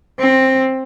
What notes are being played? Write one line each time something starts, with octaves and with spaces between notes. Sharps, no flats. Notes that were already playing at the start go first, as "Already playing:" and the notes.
C4